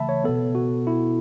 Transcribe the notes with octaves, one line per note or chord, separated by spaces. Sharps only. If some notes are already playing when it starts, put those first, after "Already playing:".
Already playing: C#3 E3 A3 E5 A5 B5
C#5
B2 B3 A4
F#4
E4